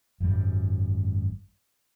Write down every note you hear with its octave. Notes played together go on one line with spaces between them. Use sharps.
G#1 F#2 A#2 G3